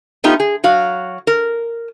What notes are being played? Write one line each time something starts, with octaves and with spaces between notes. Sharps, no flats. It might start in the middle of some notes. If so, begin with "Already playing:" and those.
A3 B3 D#4 F4 G4
G#4
F#3 F#4 F5
A#4